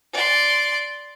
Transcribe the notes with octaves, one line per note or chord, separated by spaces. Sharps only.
D5 C6